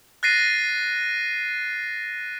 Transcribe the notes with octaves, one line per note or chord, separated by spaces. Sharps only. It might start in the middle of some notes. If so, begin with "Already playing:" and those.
F#6 A6 A#6 C7 D#7